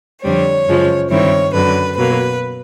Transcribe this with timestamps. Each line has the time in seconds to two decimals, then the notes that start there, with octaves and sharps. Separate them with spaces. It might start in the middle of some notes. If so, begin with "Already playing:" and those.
0.24 F2 D3 G3 C4 C#5
0.68 F#2 C#3 F3 G#3
1.10 G2 D#3 G3 C4 E4 C#5
1.54 F#2 D3 F#3 B4
1.98 B2 F#3 A#3 B4